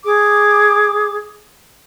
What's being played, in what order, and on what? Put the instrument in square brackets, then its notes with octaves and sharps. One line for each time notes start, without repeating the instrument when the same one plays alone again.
[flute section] G#4 D6